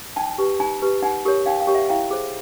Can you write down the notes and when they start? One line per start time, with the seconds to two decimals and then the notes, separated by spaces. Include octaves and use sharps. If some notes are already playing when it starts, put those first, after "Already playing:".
0.16 D#4 G5 A5
0.38 G4 B4
0.60 D#4 G#5 A#5
0.82 G4 B4
1.02 D#4 F#5 G#5
1.25 G4 A#4 C#5
1.46 D#4 F5 G5
1.60 F5 G5
1.67 G4 A#4 C#5
1.75 E5 F#5
1.89 E4 F5 G5
2.11 G#4 C5